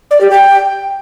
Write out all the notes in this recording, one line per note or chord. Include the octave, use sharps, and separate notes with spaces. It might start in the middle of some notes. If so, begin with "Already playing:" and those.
D5
G4
G5